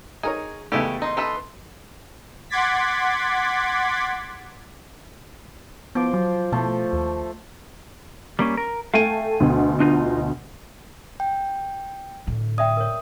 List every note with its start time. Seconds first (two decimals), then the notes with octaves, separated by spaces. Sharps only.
0.23 D#4 G#4 A#4 C#5
0.72 E2 C#3 G#3 A3 E4 G4
1.02 D#4 C6
1.17 D#4 A4 B4
2.50 F#5 C6 D6 G#6 A6 B6
5.95 F3 B3 D6
6.14 F#3
6.52 B2 F3 A3
6.93 D#2
8.39 G3 A#3 C#4
8.57 A#4
8.94 A3 F5 G5 G#5
9.40 D2 B2
9.80 D4 D#4 F4
11.20 G5
12.27 A2 D3
12.58 D5 E5 G5 D#6
12.77 A#4 C#5